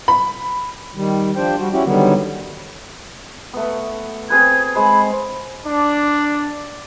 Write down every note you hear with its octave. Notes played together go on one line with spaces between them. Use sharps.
B5
D#3 G3
F3 D4 G4 C5 G5
G3 F#4
C#4 E4 F#4 G4
D3 D#3 F#3 G3 B3
A3 B3
C4 G#4 B4 G#6
G#3 C5 B5
D4